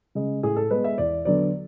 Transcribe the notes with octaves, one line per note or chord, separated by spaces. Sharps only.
C#3 G#3
A2 G#4
A4
G#3 B3 B4
E5
E2 D5
D3 F#3 B3 D5